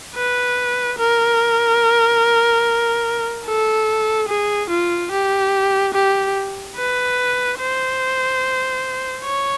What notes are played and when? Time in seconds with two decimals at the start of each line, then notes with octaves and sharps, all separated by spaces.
0.16 B4
0.98 A#4
3.46 A4
4.29 G#4
4.70 F4
5.11 G4
5.94 G4
6.77 B4
7.59 C5
9.24 C#5